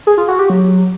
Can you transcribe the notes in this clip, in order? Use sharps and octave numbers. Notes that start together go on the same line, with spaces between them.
G#4
F4
F#4
G4
F#3